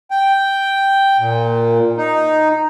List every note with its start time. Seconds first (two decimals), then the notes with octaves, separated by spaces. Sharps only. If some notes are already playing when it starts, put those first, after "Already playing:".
0.11 G5
1.19 A#2
1.97 D#4